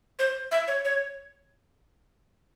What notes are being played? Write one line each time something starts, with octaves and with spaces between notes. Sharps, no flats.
C5
E5
C#5
C#5